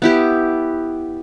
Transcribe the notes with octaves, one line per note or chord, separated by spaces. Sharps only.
B3 E4 G4